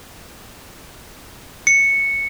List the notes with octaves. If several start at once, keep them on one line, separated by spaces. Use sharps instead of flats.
C#7